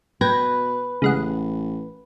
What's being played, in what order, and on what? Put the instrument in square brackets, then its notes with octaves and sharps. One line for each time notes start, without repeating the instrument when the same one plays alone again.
[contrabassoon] B2 [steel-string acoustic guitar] B4 [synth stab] G5 G#6 A#6
[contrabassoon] A1 [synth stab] C#3 G#3 F#5